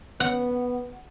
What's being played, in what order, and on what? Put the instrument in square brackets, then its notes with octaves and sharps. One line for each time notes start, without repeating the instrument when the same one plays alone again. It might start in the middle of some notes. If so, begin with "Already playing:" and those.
[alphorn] B3 [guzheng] F#5